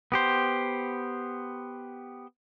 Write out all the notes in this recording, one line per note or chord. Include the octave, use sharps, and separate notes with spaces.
B3 G4 C5